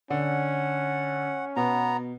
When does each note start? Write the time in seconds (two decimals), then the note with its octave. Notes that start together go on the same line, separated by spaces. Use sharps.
0.10 D3 C#4 F#5
1.56 B2 B3 A#5